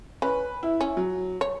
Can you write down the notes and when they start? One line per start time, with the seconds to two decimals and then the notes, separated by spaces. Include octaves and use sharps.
0.22 C#4 B4
0.63 E4
0.81 C#4
0.97 F#3
1.41 C#5